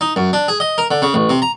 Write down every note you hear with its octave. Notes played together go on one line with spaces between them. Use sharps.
D#4
F#2
D4
G#4
D#5
A#4
D3
C#3
A1
C3
A#5